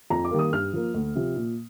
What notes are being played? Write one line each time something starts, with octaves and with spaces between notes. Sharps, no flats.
F2 A#5
D6
D#3 G3 A#3
D#6
G2 F6
F3 A#3
D2
C3 F3
A#2